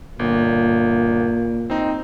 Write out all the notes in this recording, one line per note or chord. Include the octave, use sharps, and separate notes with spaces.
G1 A#2
C4 D#4